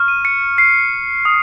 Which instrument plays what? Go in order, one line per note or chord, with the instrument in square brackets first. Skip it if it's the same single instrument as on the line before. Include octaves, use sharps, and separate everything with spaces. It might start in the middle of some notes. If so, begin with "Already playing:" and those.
Already playing: [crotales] C#6 F6
D#7
C#7
C7
D#6